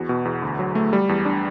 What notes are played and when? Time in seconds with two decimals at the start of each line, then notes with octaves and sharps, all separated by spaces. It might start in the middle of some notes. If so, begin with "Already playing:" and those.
Already playing: E2 F#4
0.09 B2
0.25 E2
0.42 D2
0.59 F#3
0.75 A3
0.93 G3
1.09 E2
1.25 D4